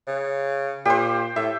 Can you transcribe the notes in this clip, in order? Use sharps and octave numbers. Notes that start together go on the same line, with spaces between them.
C#3
A#2 G4 C5
A2 E5